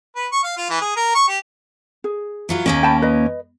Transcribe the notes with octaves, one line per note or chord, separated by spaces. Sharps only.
B4
C#6
F5
F4
E3
G#4
A#4
C#6
G4
G#4
E3 F#3 F4
D#2 A#3 C#4 D#5
G5 A5 B5
B4 D#5